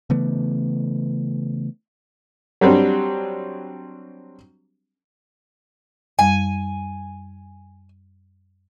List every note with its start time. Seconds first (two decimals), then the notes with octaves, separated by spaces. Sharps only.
0.10 C#3 E3 A3 B3
2.61 F#3 G3 C4 D4
6.19 F#2 G3 G#5